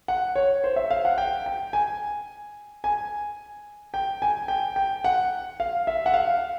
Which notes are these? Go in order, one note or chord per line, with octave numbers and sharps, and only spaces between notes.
F#5
C#5
C5
E5
F5
F#5
G5
G5
G#5
G#5
G5
G#5
G5
G5
F#5
F5
E5
F#5
F5